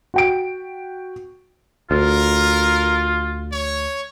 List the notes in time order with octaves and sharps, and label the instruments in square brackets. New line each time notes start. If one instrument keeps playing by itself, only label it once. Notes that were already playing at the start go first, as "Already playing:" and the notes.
[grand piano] F#4 G5 D7
[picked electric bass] D2 [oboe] F4 [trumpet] A#4
[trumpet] C#5